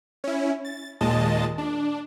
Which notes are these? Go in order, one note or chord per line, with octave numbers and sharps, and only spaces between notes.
C#4 E4
A6
D#2 A#2 G#3 D#5 A5 A6
D4